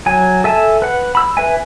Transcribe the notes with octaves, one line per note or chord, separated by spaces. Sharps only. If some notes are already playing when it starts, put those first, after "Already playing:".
F#3 G#5
A4 E5 G#5 A5
B4 F#5
B5 E6
B4 E5 G#5